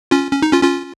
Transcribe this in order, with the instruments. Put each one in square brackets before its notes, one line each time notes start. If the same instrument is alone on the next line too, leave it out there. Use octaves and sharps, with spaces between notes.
[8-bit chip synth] C#4 F4
C#4
D#4
C#4 F4
C#4 F4